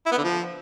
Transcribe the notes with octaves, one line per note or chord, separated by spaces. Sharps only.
E4
B3
D3
F3